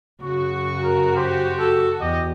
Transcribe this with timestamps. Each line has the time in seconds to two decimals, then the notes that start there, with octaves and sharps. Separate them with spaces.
0.23 F#2 C#3 F#4 C#6
0.83 A#4
1.17 G4 C5
1.59 A4
2.01 E2 G4 D#5